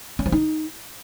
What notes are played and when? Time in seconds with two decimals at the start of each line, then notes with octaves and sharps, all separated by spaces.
0.19 C#4
0.26 F3
0.32 D#4